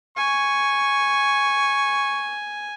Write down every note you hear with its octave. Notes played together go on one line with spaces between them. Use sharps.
G#5 C#6